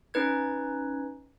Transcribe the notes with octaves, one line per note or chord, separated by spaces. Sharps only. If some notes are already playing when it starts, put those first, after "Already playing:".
C#4 D#4 B4 G#6